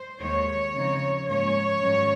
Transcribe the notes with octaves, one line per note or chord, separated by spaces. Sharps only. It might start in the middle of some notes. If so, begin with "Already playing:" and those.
Already playing: C5
D#2 D#3 G#3 C#5
C#3 F3 C4 D#4
G#2 F3 A#3 C#4 C#5
G#2 D#3 F#3 C#4